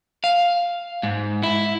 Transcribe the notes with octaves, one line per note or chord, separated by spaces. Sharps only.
F5
G#2
E4